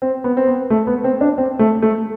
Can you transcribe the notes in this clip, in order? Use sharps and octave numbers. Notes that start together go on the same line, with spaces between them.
C4
B3
C4
B3
A3
B3
C4
D4
C4
A3
A3